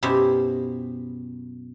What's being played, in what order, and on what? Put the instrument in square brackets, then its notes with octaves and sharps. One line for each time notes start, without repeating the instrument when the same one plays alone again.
[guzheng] F#2 B2 E4 G4 C5 E5